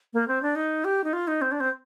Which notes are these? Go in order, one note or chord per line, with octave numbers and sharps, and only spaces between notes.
A#3
C4
D4
D#4
G4
D#4
F4
D#4
C4
D4
C4